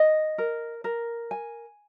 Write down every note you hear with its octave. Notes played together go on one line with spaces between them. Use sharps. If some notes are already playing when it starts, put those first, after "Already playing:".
Already playing: D#5
A#4
A#4
G#5